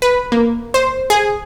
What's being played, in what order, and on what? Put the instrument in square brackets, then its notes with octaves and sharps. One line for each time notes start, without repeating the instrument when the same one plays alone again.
[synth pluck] B4
A#3
C5
G#4